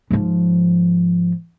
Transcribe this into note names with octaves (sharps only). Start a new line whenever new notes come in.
G#2 F3